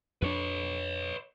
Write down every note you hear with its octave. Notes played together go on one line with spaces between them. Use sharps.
F2 D4 B4 C#5